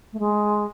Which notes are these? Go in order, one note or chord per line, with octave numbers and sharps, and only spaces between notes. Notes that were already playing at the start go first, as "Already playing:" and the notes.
A3
G#3